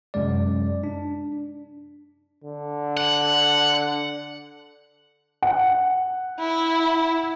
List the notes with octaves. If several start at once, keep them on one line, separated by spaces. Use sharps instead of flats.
F#2 C3 G#3 D5
D4
D3
F#5
F#5
E4